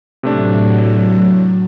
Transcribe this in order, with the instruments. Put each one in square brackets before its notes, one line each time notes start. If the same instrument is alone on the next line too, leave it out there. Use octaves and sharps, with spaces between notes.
[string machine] A2 F#3 [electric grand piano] C3 A3 D4